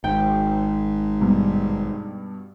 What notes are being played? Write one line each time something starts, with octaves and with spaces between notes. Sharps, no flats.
G#1 G#2 G5
G2 B2 G3